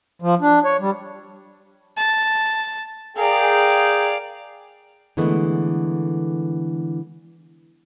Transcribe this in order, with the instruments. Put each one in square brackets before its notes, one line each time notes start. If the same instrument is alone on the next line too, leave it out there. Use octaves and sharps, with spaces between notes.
[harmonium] F3
D4
C#5
G3
[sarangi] A5
[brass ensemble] G#4 G5 [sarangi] A#4 [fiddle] D5 F5
[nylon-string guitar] D3 E3 G#3 A3 B3